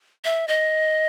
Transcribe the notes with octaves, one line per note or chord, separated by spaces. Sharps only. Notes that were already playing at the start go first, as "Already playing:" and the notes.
E5
D#5